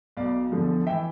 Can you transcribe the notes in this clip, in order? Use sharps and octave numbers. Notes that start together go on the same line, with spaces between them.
B1 B2 D5 F5
E2 D3 F3
E5 G5
E3